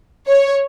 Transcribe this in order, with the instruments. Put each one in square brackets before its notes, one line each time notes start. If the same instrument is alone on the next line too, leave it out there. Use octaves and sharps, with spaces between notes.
[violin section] C#5